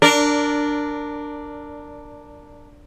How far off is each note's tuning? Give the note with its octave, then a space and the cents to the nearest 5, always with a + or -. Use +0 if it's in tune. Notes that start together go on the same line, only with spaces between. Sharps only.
D4 +0 A#4 -15 D5 -15